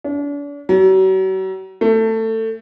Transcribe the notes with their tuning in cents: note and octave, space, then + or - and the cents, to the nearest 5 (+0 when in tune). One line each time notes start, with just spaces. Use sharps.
D4 -40
F#3 +40
A3 +20